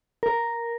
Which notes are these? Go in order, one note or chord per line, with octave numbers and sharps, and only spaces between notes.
A#4